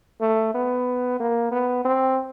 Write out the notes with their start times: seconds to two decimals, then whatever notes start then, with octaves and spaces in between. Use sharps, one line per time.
0.21 A3
0.54 B3
1.20 A#3
1.51 B3
1.85 C4